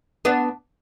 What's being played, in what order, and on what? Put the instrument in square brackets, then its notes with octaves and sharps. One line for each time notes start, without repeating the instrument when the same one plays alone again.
[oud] B3 D4